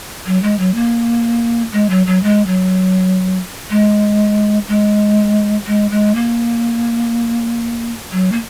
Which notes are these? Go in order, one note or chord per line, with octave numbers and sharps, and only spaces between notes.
F#3
G#3
F#3
A#3
G#3
F#3
F#3
G#3
F#3
G#3
G#3
G#3
G#3
A#3
F#3
A#3